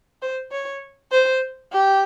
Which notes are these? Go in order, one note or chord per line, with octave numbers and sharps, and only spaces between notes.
C5
C#5
C5
G4